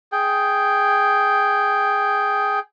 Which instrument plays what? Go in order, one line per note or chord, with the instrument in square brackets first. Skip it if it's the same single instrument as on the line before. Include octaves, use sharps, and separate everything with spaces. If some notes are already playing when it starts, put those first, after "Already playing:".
[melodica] G#4 G5